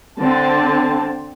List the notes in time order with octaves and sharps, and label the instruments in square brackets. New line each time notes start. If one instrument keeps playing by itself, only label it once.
[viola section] D3 C4 A5